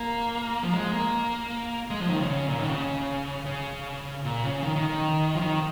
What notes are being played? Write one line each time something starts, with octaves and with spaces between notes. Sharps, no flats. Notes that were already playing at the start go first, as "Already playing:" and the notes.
Already playing: A#3
F3
G#3
A#3
G#3
F3
D#3
C#3
C#3
A#2
D#3
C#3
C#3
A#2
C#3
D#3
D#3
D#3
F3
D#3